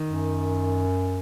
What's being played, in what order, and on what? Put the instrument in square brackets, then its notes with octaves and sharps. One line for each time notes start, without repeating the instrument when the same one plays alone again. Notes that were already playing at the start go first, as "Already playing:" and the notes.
Already playing: [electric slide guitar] D#3
[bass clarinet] F#2